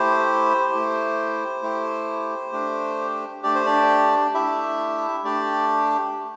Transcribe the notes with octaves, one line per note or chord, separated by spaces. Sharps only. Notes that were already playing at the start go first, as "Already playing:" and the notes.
Already playing: A3 E4 G4 C5
A3 E4 G4
A3 E4 G4
A3 D4 G4
A3 D4 G4 D5
C5
D4 D5
A3 D4 E4 G4 E5
A3 D4 G4 D5